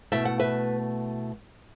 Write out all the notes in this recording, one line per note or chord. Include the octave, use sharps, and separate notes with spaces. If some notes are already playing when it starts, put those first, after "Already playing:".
B2 A3 E4 E5
F#5
B4 E5